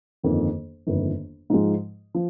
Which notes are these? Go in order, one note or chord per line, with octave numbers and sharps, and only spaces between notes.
G1 F2 D#3 A#3
G1 F2 D#3 A#3
G#2 F3 G#3
F3